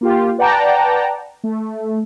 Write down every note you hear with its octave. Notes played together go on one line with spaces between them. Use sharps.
A#3 F4 G4
B4 D5 F#5 G5 A5 A#5
A3